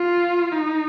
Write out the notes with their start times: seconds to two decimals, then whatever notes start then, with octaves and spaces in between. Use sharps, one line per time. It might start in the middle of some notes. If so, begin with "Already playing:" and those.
Already playing: F4
0.52 D#4